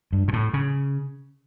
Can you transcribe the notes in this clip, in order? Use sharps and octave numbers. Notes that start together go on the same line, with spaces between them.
G2
A#2
A2
C#3